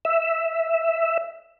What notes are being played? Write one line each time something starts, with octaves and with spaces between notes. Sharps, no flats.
E5